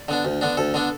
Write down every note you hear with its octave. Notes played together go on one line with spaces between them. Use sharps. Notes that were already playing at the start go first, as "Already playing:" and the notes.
Already playing: D5
D3 B3 D4
D2
D3 B3 D4
D2 A4
D3 B3 D4